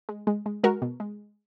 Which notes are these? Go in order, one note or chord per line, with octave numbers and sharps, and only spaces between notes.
G#3
G#3
G#3
G#3 F#4 A#4
B2
G#3